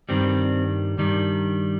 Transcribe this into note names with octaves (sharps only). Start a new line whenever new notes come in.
G2 D#3 G3 C4
G2 D#3 G3